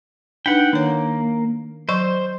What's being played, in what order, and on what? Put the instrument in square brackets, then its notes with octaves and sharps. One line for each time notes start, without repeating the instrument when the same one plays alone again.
[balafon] D4 D#4 B4 [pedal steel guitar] F#5 G5
[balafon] D#3 C#5 [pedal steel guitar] A#3
[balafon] F#3 D5 C#6 [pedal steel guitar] C5